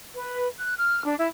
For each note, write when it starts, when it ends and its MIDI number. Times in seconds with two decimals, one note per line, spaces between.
0.15 0.47 71
0.58 0.74 90
0.77 1.02 89
1.05 1.15 62
1.19 1.27 64